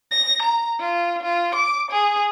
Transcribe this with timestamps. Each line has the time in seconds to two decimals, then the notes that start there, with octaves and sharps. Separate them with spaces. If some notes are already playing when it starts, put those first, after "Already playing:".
0.11 A#6
0.42 A#5
0.79 F4
1.22 F4
1.55 D6
1.91 G#4